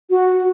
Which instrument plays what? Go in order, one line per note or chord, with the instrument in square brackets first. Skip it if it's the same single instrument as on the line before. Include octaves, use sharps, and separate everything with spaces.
[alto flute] F#4